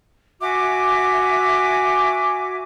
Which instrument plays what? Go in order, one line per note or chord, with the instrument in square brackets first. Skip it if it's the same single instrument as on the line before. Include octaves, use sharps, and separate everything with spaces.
[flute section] F#4 E5 G#5 D6